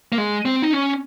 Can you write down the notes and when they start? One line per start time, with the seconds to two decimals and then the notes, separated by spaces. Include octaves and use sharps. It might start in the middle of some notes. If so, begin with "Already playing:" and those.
0.12 A#3
0.18 G#3
0.45 C4
0.62 D#4
0.73 C#4